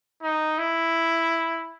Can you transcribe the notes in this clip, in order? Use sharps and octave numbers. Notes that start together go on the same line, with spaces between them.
D#4
E4